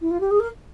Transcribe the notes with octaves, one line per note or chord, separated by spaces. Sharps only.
E4
F4
G4
G#4
A#4